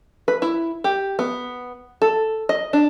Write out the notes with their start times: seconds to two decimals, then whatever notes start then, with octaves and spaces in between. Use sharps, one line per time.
0.28 B4
0.42 E4
0.84 G4
1.19 B3
2.02 A4
2.49 D#5
2.73 D4